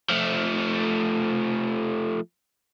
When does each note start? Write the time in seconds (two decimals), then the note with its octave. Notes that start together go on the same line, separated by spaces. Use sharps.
0.09 F3 A3